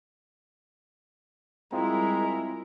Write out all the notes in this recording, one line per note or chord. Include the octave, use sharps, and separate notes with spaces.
G3 G#3 C4 E4 F4 A#4 A#5